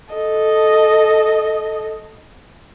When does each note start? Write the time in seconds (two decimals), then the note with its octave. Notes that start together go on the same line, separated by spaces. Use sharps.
0.13 A4 D#5